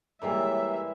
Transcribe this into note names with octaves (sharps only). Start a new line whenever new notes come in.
E3 G3 G#3 A#3 A4 C#5 E5